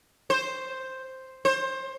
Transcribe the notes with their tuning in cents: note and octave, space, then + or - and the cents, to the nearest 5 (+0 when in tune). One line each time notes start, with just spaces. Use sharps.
C5 +0
C5 +20